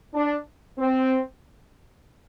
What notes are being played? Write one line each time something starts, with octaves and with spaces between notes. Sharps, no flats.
D4
C4